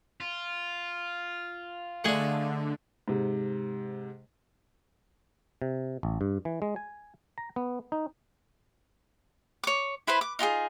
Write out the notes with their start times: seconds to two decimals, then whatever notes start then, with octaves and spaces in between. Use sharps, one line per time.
0.20 F4
2.04 D3 A3 D4 G#4 D#5 F#5
3.08 G#2 C3
5.62 C3
6.03 A1
6.21 G2
6.45 E3
6.62 G#3
6.76 G#5
7.38 A#5
7.56 B3
7.92 D#4
9.64 C#5 D6
10.07 E4 B4 C5 B5
10.21 D6
10.39 D#4 F4 G4 G#4